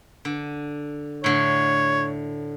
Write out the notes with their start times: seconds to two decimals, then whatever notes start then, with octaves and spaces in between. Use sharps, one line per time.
0.25 D3
1.24 A2 D3 C#5